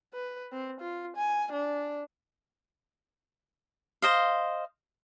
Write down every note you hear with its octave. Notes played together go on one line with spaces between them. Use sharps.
B4
C4
F4
G#5
D4
C5 D#5 F5